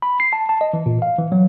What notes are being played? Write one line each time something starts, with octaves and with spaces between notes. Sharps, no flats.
B5
C7
A5
A5
D#5
E3
A#2
F5
E3
F#3